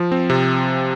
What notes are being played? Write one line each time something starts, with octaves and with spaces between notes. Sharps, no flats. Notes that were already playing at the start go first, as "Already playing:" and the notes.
Already playing: F3
C4
C3